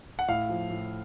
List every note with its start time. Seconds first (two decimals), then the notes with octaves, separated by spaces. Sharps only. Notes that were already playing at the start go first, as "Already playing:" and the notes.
0.19 F#5
0.28 A2 F5
0.49 F3
0.70 A2